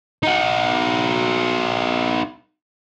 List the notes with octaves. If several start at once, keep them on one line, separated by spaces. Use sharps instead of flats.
D#4 F#4